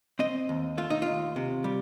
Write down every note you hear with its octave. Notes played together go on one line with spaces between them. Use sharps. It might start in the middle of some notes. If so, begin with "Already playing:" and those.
C4 D#5
D#2
A3 F4
D#4
D#2 F4
C3
G3